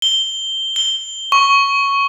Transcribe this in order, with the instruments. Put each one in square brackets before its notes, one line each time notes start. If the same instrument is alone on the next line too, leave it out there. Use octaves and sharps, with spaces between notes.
[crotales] G7
G7
C#6